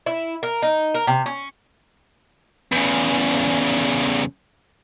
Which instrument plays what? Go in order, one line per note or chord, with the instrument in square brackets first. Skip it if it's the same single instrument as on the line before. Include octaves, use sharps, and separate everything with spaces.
[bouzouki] E4
A#4
D#4
A#4
C3
C#4
[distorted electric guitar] E2 C#3